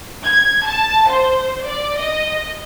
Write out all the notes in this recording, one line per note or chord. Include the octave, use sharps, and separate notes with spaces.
G#6
A5
C5
D5
D#5